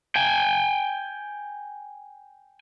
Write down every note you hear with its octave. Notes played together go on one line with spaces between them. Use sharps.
G5 G#5